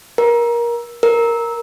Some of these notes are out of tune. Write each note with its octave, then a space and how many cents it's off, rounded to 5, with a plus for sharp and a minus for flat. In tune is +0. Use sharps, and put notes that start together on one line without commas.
A#4 +20
A#4 +0